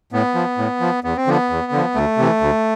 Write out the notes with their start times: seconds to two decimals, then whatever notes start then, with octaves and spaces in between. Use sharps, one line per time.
0.12 A2 B3
0.35 F3
0.58 A2
0.80 F3
1.04 E2 B3
1.17 C4
1.27 D3 F3 B3
1.50 E2
1.72 D3 F3
1.95 D2 A3
2.18 C3 E3
2.41 D2